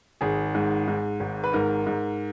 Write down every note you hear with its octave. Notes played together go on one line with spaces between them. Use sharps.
G#1 G#4
G#2
G#2
G#1
B4
G#2 A#4
G#2